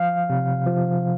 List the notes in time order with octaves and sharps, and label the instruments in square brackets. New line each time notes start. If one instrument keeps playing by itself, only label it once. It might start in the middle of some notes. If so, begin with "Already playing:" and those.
Already playing: [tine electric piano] F3 F5
C3
F3